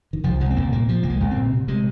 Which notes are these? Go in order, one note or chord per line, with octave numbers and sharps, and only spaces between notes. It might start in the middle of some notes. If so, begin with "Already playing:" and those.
D#3
C2 F3
C2 G#3
C4
C2 A#3
A#2 A#3
A#2 F3
C2 A#3
G#3
C2
C4
A#2
C3
C3 G#3